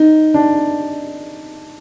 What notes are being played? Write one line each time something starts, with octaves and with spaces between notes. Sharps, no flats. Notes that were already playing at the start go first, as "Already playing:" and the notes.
Already playing: D#4
D4